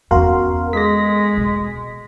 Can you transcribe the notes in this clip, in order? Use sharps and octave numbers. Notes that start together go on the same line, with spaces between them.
E2 C#4 F#4 A#4 F5 C6
G#3 G#4 A4 A#6 B6
B2